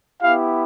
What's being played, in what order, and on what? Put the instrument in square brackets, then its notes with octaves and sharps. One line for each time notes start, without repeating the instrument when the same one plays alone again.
[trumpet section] B3 E4 G4 F5